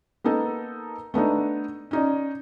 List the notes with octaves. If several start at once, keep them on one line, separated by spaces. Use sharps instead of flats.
A#3 B3 D#4 A4 A#4
A3 B3 D4 D#4
C#4 D#4 D5